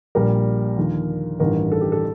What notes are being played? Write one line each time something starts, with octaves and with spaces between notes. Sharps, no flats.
A#1 A#2 G3 A#4
D#2 D3 F3
A1 G2 D#3 G3 A#4
A4
G4
A4